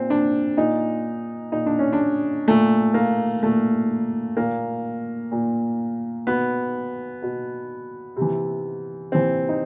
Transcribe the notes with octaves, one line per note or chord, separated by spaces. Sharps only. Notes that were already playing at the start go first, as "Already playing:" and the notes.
Already playing: A#2 C4
D4
A#2 D#4
A#2 D#4
D4
C#4
D4
A#2 A3
A#3
A#2 A3
A#2 A#3
A#2
B2 B3
B2
C3
E3
C3 E3 C4
D#4